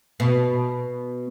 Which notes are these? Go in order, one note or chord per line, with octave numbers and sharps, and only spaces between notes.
B2